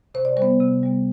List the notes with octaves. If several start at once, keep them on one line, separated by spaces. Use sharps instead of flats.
C3 C5
D5
G3 C5
B3
C3
G3 B3